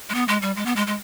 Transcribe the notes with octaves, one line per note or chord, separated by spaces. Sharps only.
G#3
B3
G#3
G3
G#3
B3
G#3
G#3